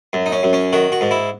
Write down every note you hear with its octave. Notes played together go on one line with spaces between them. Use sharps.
F#2
D#4
C#4
F#2
C#4
D#3 F#4
F#4
G#2
E4